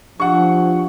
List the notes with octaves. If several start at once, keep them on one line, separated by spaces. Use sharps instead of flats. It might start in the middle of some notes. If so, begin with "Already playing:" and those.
F3 D4 G4 F#5 C#6